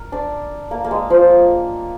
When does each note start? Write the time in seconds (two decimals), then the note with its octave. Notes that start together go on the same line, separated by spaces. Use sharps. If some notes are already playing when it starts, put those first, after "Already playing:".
Already playing: A#4
0.12 D4
0.71 A#3
0.84 A#3
0.91 G#3
1.10 F3